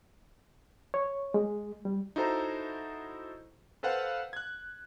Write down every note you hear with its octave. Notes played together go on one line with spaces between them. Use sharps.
C#5
G#3
G3
D#4 E4 F#4 A4 C5 A#5
A4 B4 C5 F5 F#5
F#6 G#6